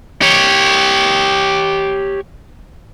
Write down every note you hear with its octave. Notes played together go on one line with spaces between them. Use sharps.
G4 C#5